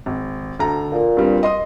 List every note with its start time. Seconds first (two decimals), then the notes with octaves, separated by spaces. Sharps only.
0.06 G#1
0.59 D2 A4 A#5
0.92 A#2
1.17 G2 G3 C4
1.43 D#5 C6 D#6